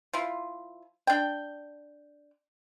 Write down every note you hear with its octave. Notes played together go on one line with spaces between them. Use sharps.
F3 E4 F4
D4 G5